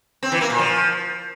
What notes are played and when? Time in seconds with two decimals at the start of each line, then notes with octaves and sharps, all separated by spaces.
0.23 C4
0.32 E3
0.41 A#3
0.50 A#2
0.59 F3